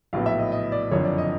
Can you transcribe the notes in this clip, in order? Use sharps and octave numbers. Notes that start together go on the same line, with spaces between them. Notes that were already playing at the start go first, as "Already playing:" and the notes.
A#1 A2 F#3 B3 F5
E5
D#5
D#5
D5
F#1 F2 D3 C#5
D5
D#5